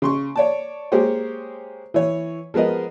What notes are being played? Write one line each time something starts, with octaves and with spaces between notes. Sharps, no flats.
C#3 C6 C#6
C#5 D5 A5
G#3 A#3 G4 G#4 C5 C#5
E3 C#5
F3 G#3 B3 A#4 D#5